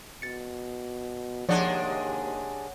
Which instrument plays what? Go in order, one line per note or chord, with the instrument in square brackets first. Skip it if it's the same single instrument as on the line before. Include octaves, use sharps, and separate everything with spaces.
[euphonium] B2 [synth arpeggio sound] A6 C#7
[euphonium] D#2 [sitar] C3 G#3 D4 [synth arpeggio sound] F3 D5 [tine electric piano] C#5 F#5